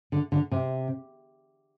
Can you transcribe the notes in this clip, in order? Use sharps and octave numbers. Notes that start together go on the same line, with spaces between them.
D3
D3
C3